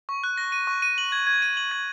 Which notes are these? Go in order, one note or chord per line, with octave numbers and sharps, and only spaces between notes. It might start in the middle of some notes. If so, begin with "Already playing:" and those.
C#6
F#6
A#6
D#7
C#6
D#7
F#7
G#6
G#6
D#7
F#7
G#6